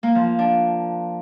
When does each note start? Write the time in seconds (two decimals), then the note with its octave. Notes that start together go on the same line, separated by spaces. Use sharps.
0.03 A#3
0.15 F3
0.39 D4